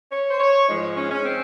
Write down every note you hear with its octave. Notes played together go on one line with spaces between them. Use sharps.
C#5
C5
C#5
G#2 F3 G#3 D#4
D#4
C#4
C#4
C4